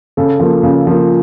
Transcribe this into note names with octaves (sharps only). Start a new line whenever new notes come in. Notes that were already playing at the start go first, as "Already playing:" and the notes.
C#3 A4
F3 A#3
C#3
F3 A#3